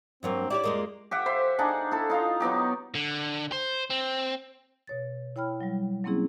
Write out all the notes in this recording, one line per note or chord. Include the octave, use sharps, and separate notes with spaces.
G2 F#3 A#3 C4
E4 G4 C#5 D5 D6
F2 G#3 A#3
G4 E5 F#5
C5 E5 C6
D4 D#4 G#4 F#5
E4 A4
D#4 F4 D#5 A#5
F#3 B3 D#4 G4
D3
C5
C4
B2 C#5 A6
E4 C#5 G5 B5 F6
F#3 G3
F#3 A#3 C4 C#4 E4 G#4